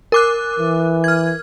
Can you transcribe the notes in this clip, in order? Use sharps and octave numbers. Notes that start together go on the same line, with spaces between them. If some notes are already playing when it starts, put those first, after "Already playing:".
A#4 D6 F#6
E3
F6 G#6